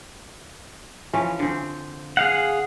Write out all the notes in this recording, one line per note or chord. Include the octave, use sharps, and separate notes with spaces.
E3 F3 C#4
D3 C4
G#4 F5 F#5